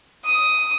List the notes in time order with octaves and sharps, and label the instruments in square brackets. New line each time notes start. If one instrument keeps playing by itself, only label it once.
[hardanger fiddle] D#6